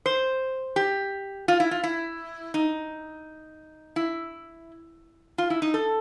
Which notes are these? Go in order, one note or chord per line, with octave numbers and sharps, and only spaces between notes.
C5
G4
F4
E4
F4
E4
D#4
E4
F4
E4
D#4
A4